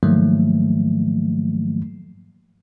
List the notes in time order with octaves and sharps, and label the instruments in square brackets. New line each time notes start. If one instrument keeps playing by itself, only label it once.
[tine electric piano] G#2 D#3 F3 F#3 A3 A#3